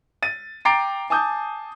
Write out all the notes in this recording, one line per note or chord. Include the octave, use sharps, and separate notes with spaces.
A6 D#7
G5 A#5 D6 A6 C7 D7
G#5 A5 D6 D#6 G6